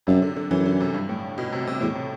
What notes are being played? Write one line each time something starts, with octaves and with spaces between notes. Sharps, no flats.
F#2 C3
D3
D3
F#2 E3
D3
C3
G2
A2
B2
C3
C3
E2 A2
C3